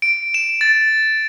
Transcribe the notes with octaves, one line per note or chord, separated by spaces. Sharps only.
D7
E7
A6